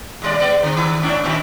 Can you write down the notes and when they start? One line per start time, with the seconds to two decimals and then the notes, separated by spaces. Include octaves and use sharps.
0.22 D#2 G3 D5
0.39 G#3 B3 D5
0.63 D3 C4
0.76 D#3
1.02 G#2 C#4 D4
1.23 A#2 D#3 E4